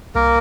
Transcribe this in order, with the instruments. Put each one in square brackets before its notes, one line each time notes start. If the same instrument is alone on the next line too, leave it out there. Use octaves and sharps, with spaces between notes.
[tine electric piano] C2 [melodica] A#3 A#4